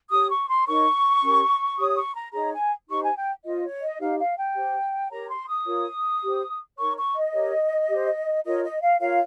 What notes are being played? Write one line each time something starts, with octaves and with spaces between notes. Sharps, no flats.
G4 C#5 D#6
C#6
C6
D#4 A#4 C#5 C#6
C#4 G4 A#4
G4 C#5 D#6
C#6
A#5
D#4 G#4 C#5 A#5
G#5
D#4 G4 C5 C#6
G#5
G5
F4 C5 D#5
C#5
D#5
D#4 G4 C5 F5
F5
G5
G4 C5
G4 A#4 C#5 A#5
C6
D#6
F4 A#4 C#5
G4 C5
D#4 A#4 C#5 C#6
C#6
D#5
G4 A#4 C#5
G4 C5
F4 A#4 C#5 D#5
D#5
F5
F4 A#4 C#5 F5